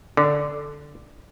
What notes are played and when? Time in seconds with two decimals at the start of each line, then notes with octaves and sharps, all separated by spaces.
0.17 D3